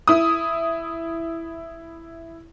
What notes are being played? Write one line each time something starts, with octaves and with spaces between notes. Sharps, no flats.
E4 D#6